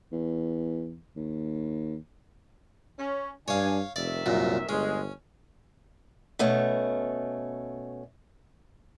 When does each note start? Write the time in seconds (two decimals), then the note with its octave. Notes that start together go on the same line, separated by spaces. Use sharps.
0.12 E2
1.16 D#2
2.99 C#4
3.48 G2 D4 C#5 F5 G#5
3.96 F1 C3 D#3 D5 E5
4.26 C2 F#2 A#2
4.69 G1 G#3 C#4
6.39 B2 A3 C#4